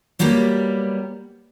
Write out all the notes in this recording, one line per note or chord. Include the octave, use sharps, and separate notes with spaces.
F#3 G3 A#3 B3 G4